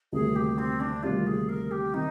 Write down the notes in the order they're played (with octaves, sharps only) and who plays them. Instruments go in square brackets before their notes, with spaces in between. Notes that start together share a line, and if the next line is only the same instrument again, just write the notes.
[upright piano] D2 C3 D#3 G3 A#3 [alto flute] G#4
[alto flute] G4
C4
D4
[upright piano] D2 C3 D#3 G3 A#3 [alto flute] F4
[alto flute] G#4
A#4
G4
[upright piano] C3 D#3 [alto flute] D#4